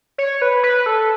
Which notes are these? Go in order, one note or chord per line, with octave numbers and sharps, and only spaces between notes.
C#5
B4
B4
A4